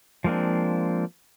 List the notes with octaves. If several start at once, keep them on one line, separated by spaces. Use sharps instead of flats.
F3 G#3 A#3 C4 D4